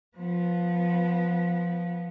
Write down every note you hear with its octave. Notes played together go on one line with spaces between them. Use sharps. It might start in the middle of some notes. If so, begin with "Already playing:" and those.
F3 B3